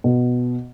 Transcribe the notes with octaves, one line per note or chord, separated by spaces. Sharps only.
B2